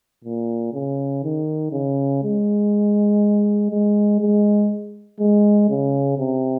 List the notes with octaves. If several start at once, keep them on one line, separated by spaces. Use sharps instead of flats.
A#2
C#3
D#3
C#3
G#3
G#3
G#3
G#3
C#3
C3